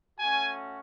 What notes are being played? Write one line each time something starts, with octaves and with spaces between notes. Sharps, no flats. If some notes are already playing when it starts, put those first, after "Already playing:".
A3 C#4 F#4 G#5